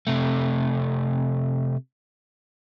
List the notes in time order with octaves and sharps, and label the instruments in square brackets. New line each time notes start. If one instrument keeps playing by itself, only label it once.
[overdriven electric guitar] C3 A3